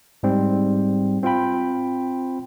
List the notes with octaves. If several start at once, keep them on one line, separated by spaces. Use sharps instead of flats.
G#2 G3 C4
C4 F4 C5 G5 B5